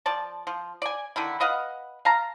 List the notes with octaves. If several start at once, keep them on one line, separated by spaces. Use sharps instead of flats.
F3 D5 A5
F3
D5 G#5
D3 D#3 E4
B4 D#5 F5 F#5
F5 A5 A#5